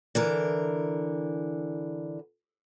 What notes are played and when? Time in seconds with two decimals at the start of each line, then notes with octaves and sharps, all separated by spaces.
0.15 D3 E3 A#4